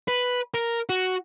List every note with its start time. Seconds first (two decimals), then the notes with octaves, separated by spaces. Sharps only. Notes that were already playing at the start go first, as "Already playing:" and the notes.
0.08 B4
0.54 A#4
0.89 F#4